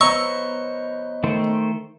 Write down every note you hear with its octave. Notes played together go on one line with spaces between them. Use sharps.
B3 C5 C#5 D#5 A#5 C#6 E6
D#3 A3 C5